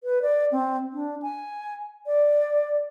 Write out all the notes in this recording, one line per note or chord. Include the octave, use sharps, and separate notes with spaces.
B4
D5
C4
D4
G#5
D5